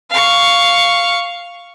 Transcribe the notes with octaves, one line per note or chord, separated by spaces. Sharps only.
F5 C#6